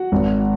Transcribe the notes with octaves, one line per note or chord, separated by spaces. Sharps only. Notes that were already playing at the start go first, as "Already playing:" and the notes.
Already playing: F#4 F#5
G#1